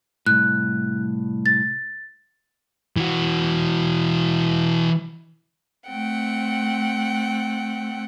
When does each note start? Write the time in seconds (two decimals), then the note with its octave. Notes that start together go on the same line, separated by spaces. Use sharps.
0.27 C2 A2 F#6
1.46 A6
2.96 E3 F#4
5.87 A3 C4 F#5 G5